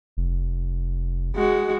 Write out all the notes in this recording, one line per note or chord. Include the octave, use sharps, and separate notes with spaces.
F1
G#3 F#4